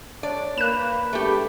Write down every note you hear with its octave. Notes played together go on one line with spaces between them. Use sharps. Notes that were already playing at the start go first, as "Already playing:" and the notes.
D4 C#5 D5
A#3 B4 F#6 E7
G#3 A3 B3 D4 G4